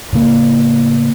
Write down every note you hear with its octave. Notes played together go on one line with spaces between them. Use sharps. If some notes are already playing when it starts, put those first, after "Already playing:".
A2 C#3 A#3 B3